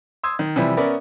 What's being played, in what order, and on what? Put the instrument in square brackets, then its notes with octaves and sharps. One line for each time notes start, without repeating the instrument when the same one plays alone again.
[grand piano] C6 D#6 E6 G#6
D#3
C3 E3 F3 G3 E4
B3 C#4 A#4 D5 E5 B5